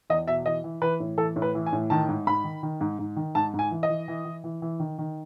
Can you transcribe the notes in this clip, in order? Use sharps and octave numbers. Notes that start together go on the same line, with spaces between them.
E2 D#5
B2 E5
E3 D#5
E3
E3 B4
A2
E3 A4
A2
B4
E3
G#5
A2
D#3 A5
G#2
G#2 B5
D#3
D#3
G#2
G#2
D#3
G#2 A5
G#2
G#5
E3
D#5
E3
E3
E3
E3
E3
D#3
D#3